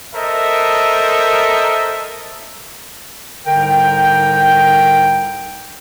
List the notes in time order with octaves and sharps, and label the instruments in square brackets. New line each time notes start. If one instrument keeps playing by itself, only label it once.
[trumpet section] A4 A#4 C5 D#5 E5
[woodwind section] C2 G#2 D3 A#4 G5